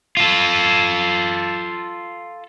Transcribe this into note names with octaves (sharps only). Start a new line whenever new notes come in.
F4 A4